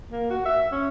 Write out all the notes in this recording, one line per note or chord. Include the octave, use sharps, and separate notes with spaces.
A#3
F#4
E5
C#4